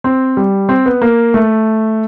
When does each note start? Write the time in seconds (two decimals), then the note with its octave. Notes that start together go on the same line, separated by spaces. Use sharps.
0.04 C4
0.37 G3
0.69 C4
0.86 B3
1.02 A#3
1.34 A3